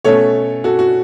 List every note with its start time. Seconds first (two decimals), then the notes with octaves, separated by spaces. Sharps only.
0.05 B2 A3 C#4 A4 C#5
0.64 F#4 A4
0.79 F#4